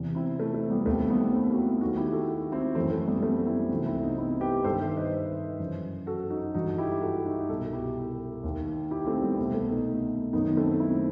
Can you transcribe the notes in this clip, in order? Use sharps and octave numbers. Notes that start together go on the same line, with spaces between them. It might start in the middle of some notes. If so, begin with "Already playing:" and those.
Already playing: E2 C3 E3
C4 E4
A3
A3
G3 B3
D#2 D#3 A3 C4
G3 B3
A3 C4
F#4
C4 E4
D#2 D#3 D#4 F#4
E4 G4
F#4 A4
C4 E4
F#2 E3 A3 C4
A3
G3 B3
A3 C4
C4 E4
C2 C3 E3 D#4 F#4
C4 E4
B3 D#4
C4 E4
G4 B4
G2 D#3 A4 C5
C5 E5
B4 D#5
F#2 E3
F#4 A4
D#4 F#4
G2 E3 D#4 F#4
E4 G4
F#4 A4
D#4 F#4
C2 B2 F#4 A4
E4 G4
D#2 D#3
E4 G4
A3 C4
G3 B3
C2 B2 A3
A3
B3 D#4
F#2 D#3 B3 D#4
A3 C4
C4 E4